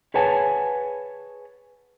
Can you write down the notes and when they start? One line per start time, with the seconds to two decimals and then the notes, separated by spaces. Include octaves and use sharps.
0.14 G#4 B4 C#5 F#5 G#5 A5